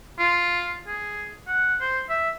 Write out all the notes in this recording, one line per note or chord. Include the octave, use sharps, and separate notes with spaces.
F4
G#4
F#5
C5
E5